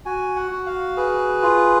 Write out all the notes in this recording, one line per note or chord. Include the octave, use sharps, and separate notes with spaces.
F#4 G#5
F#5
F#4
F5
G#4 B4
F4